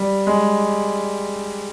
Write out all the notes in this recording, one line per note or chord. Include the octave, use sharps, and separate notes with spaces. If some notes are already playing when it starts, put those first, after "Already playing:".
Already playing: G3
G#3